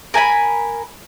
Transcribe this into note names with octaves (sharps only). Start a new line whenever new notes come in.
A#4 G#5 A5 B5